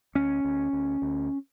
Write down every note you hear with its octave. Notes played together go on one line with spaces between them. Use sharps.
D2 C#4
D2
D2
D2